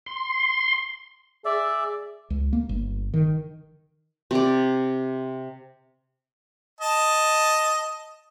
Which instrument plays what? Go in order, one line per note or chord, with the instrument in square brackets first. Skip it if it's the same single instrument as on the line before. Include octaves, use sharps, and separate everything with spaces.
[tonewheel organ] C6
[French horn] G#4 [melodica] D5 E5
[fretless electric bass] C#2
A#3
G1
D#3
[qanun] C3 D5
[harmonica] D#5 A5